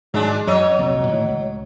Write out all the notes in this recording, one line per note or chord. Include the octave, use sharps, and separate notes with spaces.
G#2 D#3 F#3 G#3 D4
F#2 F#3 C#5 D#5
C2 F2 A#2
A2 D#3 E3
C#2